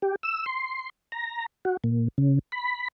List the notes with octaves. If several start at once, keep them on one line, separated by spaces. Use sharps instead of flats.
G4
E6
C6
A#5
F#4
A#2
C#3
B5